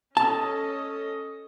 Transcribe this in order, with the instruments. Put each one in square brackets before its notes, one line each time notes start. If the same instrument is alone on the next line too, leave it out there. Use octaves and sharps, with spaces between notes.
[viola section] C#4 A4 D#5 [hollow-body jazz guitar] A5